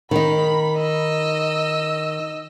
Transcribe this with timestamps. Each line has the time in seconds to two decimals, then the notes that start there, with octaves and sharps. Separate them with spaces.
0.11 D#3 D#4 B5
0.77 D#5 E6